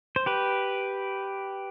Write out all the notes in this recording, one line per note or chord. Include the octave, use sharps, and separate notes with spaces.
C5
G4 B4